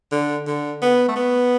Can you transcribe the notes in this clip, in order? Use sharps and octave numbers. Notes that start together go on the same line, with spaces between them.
D3
D3
B3
A3
B3